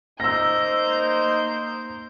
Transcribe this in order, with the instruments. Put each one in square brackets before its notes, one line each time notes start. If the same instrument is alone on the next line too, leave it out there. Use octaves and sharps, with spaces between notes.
[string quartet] A#3 C5 G6 [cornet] D#4 [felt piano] E6 A#6